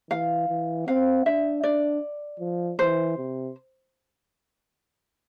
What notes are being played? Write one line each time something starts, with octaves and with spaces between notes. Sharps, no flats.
E3 F5
E3
C4 F5
D4 E5
D4 D5
F3
E3 C5
C3